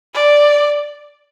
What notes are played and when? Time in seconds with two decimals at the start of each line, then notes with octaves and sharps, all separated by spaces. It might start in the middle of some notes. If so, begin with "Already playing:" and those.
0.14 D5